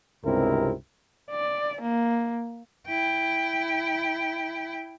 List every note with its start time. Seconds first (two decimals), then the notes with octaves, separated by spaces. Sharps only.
0.25 C#2 G2 C3 C4 E4 A#4
1.31 D5
1.82 A#3
2.88 E4 G5